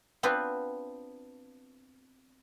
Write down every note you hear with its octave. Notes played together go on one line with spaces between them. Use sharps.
B3 C4 D4 F4 B4